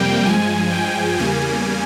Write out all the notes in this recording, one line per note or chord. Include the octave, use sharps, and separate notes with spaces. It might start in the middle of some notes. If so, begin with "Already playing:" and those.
Already playing: F2 C3 G3 A#3 G5
G2 F3 G#3 G#5
G5
E2 C#3 G3 A#3 G#5